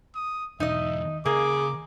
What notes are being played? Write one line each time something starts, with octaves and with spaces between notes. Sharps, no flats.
D#6
B1 E2 D#4 D#5 E5
C#3 A#3 G#4 D6